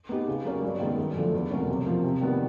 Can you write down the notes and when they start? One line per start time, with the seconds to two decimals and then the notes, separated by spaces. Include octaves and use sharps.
0.09 B3 D#4 G4
0.28 C#3
0.45 F#3 A#3 C#4
0.62 G2
0.80 D#3 G#3 B3 D#4
0.97 F#2
1.16 D3 F3 A3 D4
1.33 E2
1.51 B2 F#3 A#3 C#4
1.68 C3
1.86 F3 A#3
2.03 C3
2.21 D#3 G3 B3